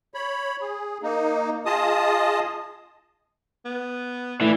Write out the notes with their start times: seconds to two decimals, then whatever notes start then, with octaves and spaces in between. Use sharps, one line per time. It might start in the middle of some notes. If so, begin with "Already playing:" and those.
0.14 C#5 B5
0.61 G#4
1.02 A#3 D#4
1.65 F4 G#4 D#5 A5 D#6
3.65 B3
4.41 A2 E3 D5